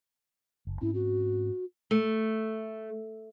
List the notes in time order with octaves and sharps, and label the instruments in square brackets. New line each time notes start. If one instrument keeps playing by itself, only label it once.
[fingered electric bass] F#1
[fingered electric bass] G#2 C4 C#4 [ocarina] E4
[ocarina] F#4
[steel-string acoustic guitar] A3